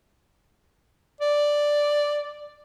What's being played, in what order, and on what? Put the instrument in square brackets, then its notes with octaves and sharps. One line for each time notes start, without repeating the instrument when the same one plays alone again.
[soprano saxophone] D5